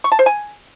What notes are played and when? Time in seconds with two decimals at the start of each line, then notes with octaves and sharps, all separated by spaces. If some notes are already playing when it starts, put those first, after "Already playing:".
0.04 C#6
0.12 A5
0.19 C5
0.26 G#5